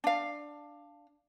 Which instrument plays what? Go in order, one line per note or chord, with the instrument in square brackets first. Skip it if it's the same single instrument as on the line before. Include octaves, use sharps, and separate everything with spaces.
[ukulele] D4 F5